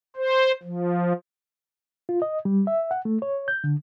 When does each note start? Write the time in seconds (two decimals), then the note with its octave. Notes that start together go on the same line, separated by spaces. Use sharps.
0.16 C5
0.63 F3
2.09 F4
2.22 D#5
2.45 G3
2.67 E5
2.91 F#5
3.05 A3
3.22 C#5
3.48 G6
3.64 D3